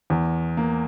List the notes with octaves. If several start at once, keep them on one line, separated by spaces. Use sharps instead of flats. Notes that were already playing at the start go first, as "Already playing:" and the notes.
E2
A#3